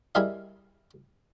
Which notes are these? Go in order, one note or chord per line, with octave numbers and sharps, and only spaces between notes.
G3 E4 G#4 A#4 D#5 F5